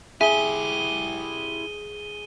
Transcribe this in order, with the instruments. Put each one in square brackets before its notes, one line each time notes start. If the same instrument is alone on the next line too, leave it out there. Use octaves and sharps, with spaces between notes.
[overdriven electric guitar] E4 G4 [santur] G#4 [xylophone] E5 [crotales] D#7 G7